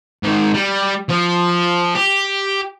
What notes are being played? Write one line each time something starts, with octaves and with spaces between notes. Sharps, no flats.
G#2 D#3
G3
F3
G4